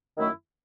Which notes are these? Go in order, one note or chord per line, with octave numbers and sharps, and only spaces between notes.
F#2 D#3 A3 E4